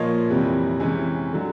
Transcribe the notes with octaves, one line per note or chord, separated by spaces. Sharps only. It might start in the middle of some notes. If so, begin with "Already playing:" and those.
Already playing: A#2 F3 A#3 C#5 D#5
F2 C3 E3 G3
C3 E3 G#3 C#4
D3 F#3